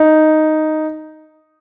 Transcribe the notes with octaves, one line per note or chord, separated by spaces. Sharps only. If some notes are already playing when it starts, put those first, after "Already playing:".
Already playing: D#4